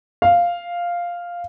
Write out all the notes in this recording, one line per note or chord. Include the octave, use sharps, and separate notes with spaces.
F5